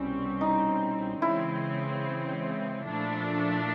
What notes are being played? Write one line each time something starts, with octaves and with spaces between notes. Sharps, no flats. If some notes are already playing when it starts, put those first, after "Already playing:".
Already playing: C2 B2 G3 C4 C#4
D#4
C#3 E3 G#3 C4 E4
A#2 F3 A3 D4